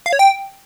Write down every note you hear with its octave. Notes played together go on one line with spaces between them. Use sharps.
F5
C#5
G5